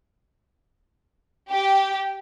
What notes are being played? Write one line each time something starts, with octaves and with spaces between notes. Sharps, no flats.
G4